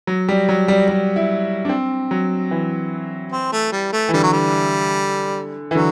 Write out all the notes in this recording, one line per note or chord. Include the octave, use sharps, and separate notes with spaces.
F#3
G3
F#3
G3
G3
E4
D4
C4
F#3
E3
C4
A3
G3
A3
E3
D3 G3
F#3
G3
E3
D3 F#3